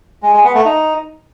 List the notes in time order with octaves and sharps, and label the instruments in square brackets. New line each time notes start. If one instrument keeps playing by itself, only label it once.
[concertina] G#3
G#3
B3
A3
D#4